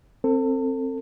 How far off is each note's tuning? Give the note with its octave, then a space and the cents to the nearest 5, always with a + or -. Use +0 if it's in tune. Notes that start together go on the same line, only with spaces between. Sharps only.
C4 +15 A4 +35